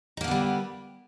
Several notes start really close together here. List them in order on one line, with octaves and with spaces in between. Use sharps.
D#4 A#3 D3 B3 G3